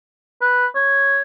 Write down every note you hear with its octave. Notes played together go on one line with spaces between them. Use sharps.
B4
C#5